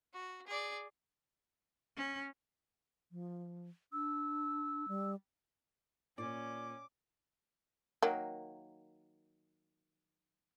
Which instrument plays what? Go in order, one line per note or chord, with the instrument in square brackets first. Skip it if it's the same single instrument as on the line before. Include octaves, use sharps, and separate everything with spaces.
[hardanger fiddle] F#4
G#4 D5
[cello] C#4
[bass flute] F3
[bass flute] D4 [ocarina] E6
[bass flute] G3
[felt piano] A#2 [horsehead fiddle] C#4 [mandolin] D5 [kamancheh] D6
[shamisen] D#3 F#3 A#3